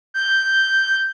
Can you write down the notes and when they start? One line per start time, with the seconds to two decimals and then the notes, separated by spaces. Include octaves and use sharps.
0.14 G6